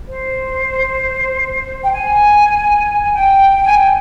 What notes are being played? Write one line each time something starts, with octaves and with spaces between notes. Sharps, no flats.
C5
G5
G#5
G#5
G5
G#5
G5